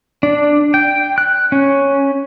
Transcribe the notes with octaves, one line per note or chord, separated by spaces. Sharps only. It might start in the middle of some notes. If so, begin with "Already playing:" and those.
D4
G5
F#6
C#4